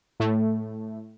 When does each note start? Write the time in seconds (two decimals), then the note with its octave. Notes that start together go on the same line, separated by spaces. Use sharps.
0.20 A2 A3